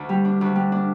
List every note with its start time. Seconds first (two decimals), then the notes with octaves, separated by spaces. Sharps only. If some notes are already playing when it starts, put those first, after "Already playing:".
Already playing: D2
0.09 G3
0.25 D4
0.41 D2
0.56 G3
0.72 D4